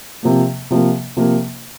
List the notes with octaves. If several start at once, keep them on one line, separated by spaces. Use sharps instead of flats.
C3 F3 A#3
C3 F3 A#3
C3 F3 A#3